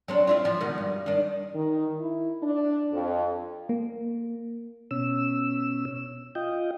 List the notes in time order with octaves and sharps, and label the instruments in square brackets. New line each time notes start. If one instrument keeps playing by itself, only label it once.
[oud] F#3 C4 D4
C4 E4 F4
F3
B2 D#3
G2
D#3 D4
[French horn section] D#3
E4
D4
F2
[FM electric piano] A#3
[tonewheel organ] B2 C#4 E6
F4 D#5 G5